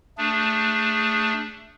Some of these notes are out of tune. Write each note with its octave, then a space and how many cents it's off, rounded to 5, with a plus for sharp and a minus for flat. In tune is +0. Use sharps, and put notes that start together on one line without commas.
A3 +15 D4 +0 G#4 -10